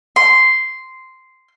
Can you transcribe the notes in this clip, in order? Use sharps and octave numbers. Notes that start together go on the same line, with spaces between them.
C6